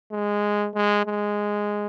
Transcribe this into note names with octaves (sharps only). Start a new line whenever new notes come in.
G#3
G#3
G#3